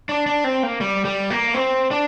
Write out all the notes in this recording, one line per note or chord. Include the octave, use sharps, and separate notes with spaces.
D4
D4
C4
A#3
G3
G3
A#3
C4
D4